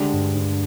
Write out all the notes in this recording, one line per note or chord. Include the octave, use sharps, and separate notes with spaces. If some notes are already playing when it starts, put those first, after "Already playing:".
Already playing: D2 D3 G#3 D4 G4
G2
G#2
G2